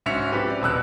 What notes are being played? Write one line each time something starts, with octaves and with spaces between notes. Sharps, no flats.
G#2 C#4 F#4 E5 C#7 F7
F3 C4 G4 B4
D5
D#1 B2 E6 F#6